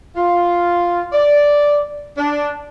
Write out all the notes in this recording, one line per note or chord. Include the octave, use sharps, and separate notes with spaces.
F4
D5
D4